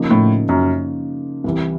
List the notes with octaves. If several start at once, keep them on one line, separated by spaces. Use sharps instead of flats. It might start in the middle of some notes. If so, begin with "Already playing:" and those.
Already playing: C#3 F3 A#3 D#4
A2
F#2
C2 C3 E3 G3